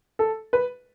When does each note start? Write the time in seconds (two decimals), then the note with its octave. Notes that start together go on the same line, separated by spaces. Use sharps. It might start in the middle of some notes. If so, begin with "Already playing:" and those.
0.19 A4
0.53 B4